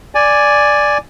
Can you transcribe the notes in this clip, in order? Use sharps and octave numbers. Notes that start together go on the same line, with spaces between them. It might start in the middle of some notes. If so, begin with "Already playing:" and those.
D5 G#5